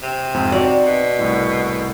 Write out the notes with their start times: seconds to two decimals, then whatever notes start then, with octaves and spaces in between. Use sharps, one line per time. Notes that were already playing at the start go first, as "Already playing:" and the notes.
0.03 C3
0.34 F2 G#2 C4
0.52 C4 D#4 F#4 D5
0.86 B2
1.19 C2 A2